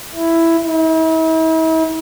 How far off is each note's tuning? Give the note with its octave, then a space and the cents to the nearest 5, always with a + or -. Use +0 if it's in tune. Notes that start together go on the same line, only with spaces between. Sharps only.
E4 +5
E4 -45